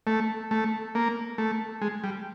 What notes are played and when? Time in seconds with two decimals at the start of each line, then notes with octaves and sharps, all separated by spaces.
0.07 A3
0.51 A3
0.95 A#3
1.38 A3
1.82 G#3
2.04 G3